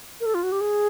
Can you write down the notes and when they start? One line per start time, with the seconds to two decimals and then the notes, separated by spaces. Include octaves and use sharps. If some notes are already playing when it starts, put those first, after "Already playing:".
0.20 A#4
0.26 A4
0.34 F4
0.43 F#4
0.52 G4
0.61 G#4